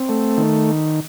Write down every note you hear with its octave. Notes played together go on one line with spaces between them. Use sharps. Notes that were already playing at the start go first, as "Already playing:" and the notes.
Already playing: C4
A3
D#3